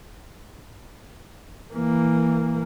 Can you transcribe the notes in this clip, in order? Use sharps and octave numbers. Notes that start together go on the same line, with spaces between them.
E3 A#3